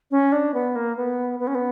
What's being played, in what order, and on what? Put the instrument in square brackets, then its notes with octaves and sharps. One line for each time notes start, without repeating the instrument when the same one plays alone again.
[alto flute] C#4
D4
B3
A#3
B3
B3
C#4
B3